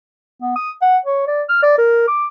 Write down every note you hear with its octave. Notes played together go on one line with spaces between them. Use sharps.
B3
D#6
F#5
C#5
D5
F6
D5
A#4
D6